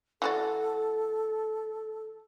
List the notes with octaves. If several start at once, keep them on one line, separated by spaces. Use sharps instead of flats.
E3 F#4 A4 D5